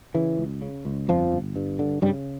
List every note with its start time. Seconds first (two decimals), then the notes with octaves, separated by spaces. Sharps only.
0.14 C#3 E3
0.38 C#2
0.62 C#3
0.85 C#2
1.08 G1 F2 F3
1.32 G1
1.56 G2
1.79 D3
2.02 G2 C#3 G3